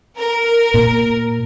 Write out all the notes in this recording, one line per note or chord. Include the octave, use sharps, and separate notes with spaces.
A#4
A#2